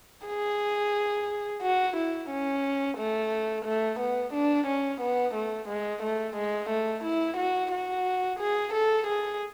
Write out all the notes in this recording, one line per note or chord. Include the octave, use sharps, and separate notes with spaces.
G#4
F#4
E4
C#4
A3
A3
B3
D4
C#4
B3
A3
G#3
A3
G#3
A3
E4
F#4
F#4
G#4
A4
G#4